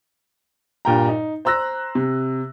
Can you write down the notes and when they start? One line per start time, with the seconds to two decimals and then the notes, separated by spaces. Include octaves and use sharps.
0.85 G2 A#2 G5 A#5
1.09 D#4
1.45 C5 A#5 E6 F#6 A#6
1.95 C3